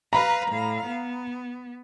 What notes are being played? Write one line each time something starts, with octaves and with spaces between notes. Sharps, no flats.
B4 F5 A#5 B5
A2 F5
B3